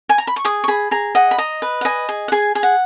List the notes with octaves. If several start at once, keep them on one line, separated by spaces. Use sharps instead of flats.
G#5
A#5
B5
C#6
G#4 D#6
C#6
G#4 B5
G#4 A#5
D#5 F#5
B5
D#5 A#5
B4
F#5
D#5 G#5
G#4
F#5
G#4 G#5
G#4
F#5